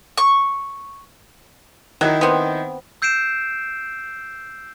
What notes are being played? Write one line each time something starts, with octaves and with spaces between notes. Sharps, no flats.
C#6
D#3 F#3 D#4 E4
B3 C4
E6 G6 C7 D7 E7